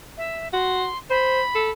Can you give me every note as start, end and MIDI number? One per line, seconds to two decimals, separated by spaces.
0.17 0.48 76
0.53 0.88 66
0.53 0.97 84
1.10 1.42 72
1.10 1.70 83
1.55 1.71 69